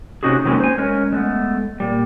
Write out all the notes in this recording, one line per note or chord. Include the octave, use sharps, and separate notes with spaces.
C3 E3 C#4 D#4 F#4 G#4
C3 D#3 F#3 G#3 A#3 C#4
C5 G#5
G#3 C#4 A#4 C#5
G#3 A3 B3
A#2 G3